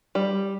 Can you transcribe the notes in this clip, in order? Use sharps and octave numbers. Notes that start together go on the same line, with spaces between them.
G3